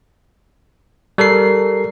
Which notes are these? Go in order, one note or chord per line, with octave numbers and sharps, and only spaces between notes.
G3 A4 A#4 C7